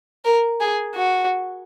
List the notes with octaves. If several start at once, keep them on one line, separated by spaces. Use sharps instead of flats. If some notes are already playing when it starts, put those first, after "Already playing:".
A#4
G#4
F#4